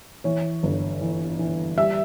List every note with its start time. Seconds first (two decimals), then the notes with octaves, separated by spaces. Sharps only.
0.24 E3 C#5
0.63 G1
1.01 E3
1.39 E3
1.77 G3 E5